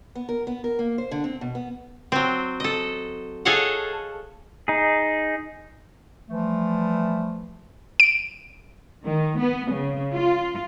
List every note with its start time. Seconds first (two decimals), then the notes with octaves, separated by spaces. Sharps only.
0.15 B3
0.29 A#4
0.47 B3
0.64 A#4
0.79 A#3
0.98 C5
1.11 D3
1.24 C4
1.41 B2
1.55 B3
2.12 F#3 C4
2.60 A4 D#5
3.45 G#4 A4 C#5 D#5 F5 F#5
4.68 D#4 G#4
6.28 E3 F3 G3 A3
8.00 D7
9.04 D#3
9.38 B3
9.71 C#3
10.13 F4